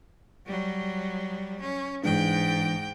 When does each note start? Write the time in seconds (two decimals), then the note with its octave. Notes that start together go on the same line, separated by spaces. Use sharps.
0.46 F#3 G3
1.61 C#4
2.04 G#2 E3 G#3 D4 G5